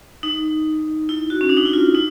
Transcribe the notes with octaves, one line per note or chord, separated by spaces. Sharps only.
D#4
E4
F#4
C#4
D4
D#4
E4
F4
D#4